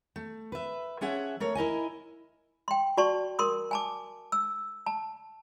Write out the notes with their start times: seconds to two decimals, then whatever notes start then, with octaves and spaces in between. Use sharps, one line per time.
0.16 A3
0.52 B4 E5
1.01 F3 C#4 G#4 E5 F#5
1.40 A3 A#4 C#5
1.55 E4 A#4 D#5 G#5
2.68 G5 C6
2.97 F#4 D5 A5 C6 C#6
3.39 A#4 C6 D#6
3.71 G#5 A5 D6
4.32 E6
4.86 A5